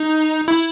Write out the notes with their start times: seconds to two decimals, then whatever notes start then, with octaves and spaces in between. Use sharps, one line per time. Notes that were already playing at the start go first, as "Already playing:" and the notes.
Already playing: D#4
0.48 E4